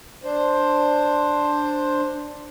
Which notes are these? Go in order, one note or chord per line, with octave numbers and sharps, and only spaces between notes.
D4 C5